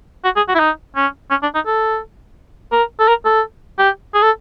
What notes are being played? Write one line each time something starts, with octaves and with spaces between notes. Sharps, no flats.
F#4
G#4
F#4
E4
D#4
C#4
C#4
D4
D#4
A4
A#4
A4
A#4
A4
G4
G#4
A4